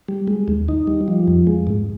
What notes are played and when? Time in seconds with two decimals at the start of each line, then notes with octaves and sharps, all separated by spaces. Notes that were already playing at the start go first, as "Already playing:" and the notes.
0.08 G3
0.27 G#3
0.48 D#2
0.68 D#4
0.87 G3
1.08 F3
1.28 F2
1.47 G#3
1.67 G#2